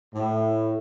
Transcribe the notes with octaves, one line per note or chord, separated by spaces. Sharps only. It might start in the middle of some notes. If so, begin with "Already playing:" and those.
A2